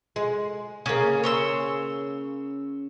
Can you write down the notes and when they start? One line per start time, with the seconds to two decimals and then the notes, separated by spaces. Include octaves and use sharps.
0.16 G#3
0.86 C#3 A#3 G#4
1.24 C#5 C6 E6